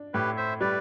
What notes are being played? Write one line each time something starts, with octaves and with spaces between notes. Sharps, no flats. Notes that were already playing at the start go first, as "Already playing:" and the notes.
Already playing: D4
A2 G4 B4
C5 E5
G3 B4 D5